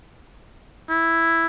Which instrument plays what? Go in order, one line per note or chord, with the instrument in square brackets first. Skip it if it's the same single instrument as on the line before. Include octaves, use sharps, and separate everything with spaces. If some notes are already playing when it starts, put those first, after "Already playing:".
[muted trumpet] E4